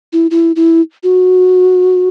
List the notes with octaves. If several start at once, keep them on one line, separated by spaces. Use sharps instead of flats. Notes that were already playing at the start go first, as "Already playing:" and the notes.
E4
E4
E4
F#4